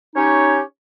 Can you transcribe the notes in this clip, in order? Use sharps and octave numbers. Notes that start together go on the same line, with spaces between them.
C#4 D#4 G4 C#5